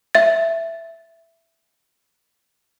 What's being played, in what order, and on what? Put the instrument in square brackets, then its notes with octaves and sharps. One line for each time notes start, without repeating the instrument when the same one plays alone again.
[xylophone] E5 A6